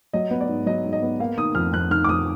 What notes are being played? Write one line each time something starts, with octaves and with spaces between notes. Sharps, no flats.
F#3 D#5
B3
D5
G#2
F#3 D#5
G#2
D#5
B3
A#3 F5
D#3 D#6
F2 F6
F2 F#6
D#3 F6
D6
F2 D#6